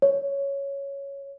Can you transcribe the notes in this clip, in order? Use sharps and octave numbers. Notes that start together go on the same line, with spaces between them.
C#5